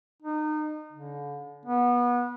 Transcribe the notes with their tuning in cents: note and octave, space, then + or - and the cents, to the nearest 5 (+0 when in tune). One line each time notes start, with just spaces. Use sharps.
D#4 -30
D3 -40
B3 -25